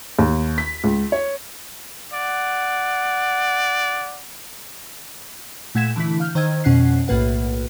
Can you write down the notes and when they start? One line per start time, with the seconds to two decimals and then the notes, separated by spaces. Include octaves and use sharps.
0.19 D#2
0.58 B6
0.84 C#2
1.12 C#5
2.13 D5 F#5
5.75 A#2 A3 F#5 G#6 B6 E7
5.96 D3 E3 A3 E4 B6
6.20 F5 F6 G6
6.35 D#3 C5 D#5 G5 E6 G#6
6.64 F2 B2 C#4 F#5 F#6 C7
7.08 B1 A2 A#3 B4 F#5